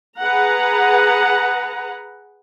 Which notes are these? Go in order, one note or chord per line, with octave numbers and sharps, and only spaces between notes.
G#4 B4 F#5 A#5